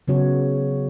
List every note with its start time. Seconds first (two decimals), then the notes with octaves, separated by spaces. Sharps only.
0.08 C#3 F#3 B3 F#4 C#5